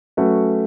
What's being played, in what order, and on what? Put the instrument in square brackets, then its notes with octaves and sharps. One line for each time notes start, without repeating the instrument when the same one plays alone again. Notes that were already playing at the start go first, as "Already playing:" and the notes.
[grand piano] F#3 C#4 F#4 B4 [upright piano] A3